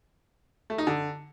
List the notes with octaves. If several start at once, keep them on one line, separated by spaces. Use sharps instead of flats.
A3
D#4
D3